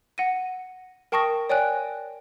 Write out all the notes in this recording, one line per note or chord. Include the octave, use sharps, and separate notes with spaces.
F#5 A#6 D#7
A#4 G5 A5 C#6 D#6 A#6
C#5 D5 G5 G#5 F#6